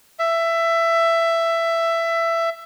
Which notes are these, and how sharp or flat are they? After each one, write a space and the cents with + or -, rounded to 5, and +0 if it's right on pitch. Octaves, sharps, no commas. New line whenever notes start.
E5 +15